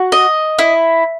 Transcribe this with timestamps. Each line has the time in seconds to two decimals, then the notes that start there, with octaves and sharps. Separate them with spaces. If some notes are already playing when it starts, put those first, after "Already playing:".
Already playing: F#4
0.12 D#5
0.59 E4